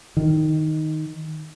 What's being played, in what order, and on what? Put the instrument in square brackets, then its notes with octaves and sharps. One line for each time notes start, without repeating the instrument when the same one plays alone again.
[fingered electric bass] D#3